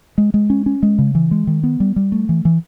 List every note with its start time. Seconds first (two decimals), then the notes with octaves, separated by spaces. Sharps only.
0.18 G#3
0.34 G#3
0.50 C#4
0.66 C#4
0.83 G#3
0.99 C#3
1.15 E3
1.31 G#3
1.47 D#3
1.64 B3
1.80 G3
1.96 G3
2.12 A3
2.29 E3
2.45 E3